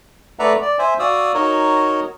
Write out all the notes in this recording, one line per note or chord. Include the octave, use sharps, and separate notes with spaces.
A3 B4 D5 E5 F#5 A#5
D5
C5 E5 G#5
F#4 D5 F5 D#6 E6
D#4 F#4 A#4 C#5